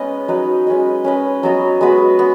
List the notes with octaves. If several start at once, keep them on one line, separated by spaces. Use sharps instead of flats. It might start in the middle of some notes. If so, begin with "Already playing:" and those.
Already playing: G#3 B3 C#4 D#4 B4 D#5
F#3 D#4 B4 D#5
G#3 C#4 B4 D#5
C#4 B4 D#5
F#3 B3 F#4 D#5
G#3 B3 F#4 B4
B3